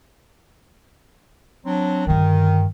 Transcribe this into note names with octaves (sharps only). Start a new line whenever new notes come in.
F#3 C4 D4
G2 D3 D#3